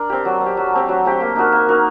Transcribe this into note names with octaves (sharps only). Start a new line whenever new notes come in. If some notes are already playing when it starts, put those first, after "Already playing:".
Already playing: D4 A#4 D5
C4 G4
F#3
C4
G4
F#3
A3 C4 G4
F#3
A3 C4 G4
A#3
D#4 F#4 A#4
A#3
D#4 F#4 A#4